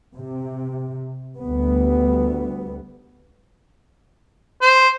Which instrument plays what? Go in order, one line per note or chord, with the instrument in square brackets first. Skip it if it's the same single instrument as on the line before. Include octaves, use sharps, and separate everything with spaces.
[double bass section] C3
D2 G3 B3
[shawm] C5